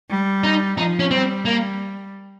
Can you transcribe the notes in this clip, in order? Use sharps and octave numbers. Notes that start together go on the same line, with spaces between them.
G3
D#4
F3 D#4
C#4
G3 C4
A#3